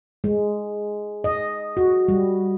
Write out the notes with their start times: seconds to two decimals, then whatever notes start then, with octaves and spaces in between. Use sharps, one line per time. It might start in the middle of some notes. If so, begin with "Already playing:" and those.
0.24 G#3
1.24 D#5
1.77 F#4
2.08 G3